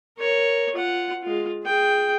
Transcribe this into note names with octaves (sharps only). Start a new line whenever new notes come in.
A#4 C#5
F4 F#5
G#3 F4
G#4 G5